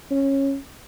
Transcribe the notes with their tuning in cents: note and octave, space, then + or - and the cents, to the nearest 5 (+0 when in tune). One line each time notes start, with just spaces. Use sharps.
C#4 -15